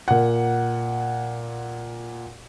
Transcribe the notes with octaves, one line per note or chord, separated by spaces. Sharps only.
A#2 F#5